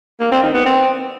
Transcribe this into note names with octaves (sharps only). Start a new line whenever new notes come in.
A#3
C4
D#3
B3
C4